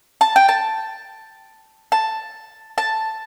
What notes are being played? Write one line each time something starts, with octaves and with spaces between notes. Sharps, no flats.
A5
G5
A5
A5
A5